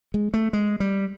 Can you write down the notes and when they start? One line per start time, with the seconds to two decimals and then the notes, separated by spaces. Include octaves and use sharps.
0.14 G#3
0.34 A3
0.53 G#3
0.80 G3